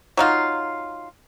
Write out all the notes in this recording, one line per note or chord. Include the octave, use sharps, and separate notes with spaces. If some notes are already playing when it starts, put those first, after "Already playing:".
F#3 D#4 F4